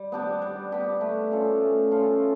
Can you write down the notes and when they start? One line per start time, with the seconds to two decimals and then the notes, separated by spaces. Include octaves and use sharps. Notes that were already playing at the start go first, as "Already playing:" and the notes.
Already playing: G3
0.12 B3 D4 G4
0.42 G3
0.72 B3 D4 G4
1.01 A3
1.31 C#4 F4 A4
1.61 A3
1.91 C#4 F4 A4